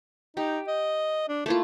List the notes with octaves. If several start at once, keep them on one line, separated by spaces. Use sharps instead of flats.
D#4 G4
D#5
D4
A3 A#3 E4 F4